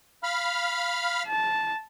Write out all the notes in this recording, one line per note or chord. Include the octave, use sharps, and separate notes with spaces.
F5 B5 F6
A5